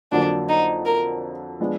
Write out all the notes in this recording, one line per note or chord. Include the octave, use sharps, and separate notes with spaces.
F2 D3 F#3 A#3 D4
D#4
A#4
F3 G#3 B3 D4